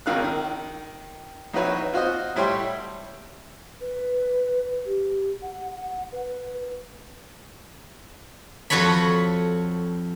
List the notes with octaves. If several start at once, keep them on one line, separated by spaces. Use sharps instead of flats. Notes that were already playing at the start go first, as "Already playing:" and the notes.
G#1 C#2 D#3 F5 F6 F#6
D#3
A#1 D#4 E4 F#4 B4 C#5
F4 F#4 C5 D#5
A2 G3 E4 C#5 G5 C6
B4
G4
F#5
F#5
B4
F2 F#4 A4 C#5 B5